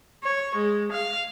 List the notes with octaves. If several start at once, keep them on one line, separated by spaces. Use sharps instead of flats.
C#5
G#3
F5